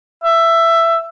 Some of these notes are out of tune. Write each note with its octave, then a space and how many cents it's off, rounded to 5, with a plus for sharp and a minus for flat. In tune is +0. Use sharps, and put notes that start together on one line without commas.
E5 +15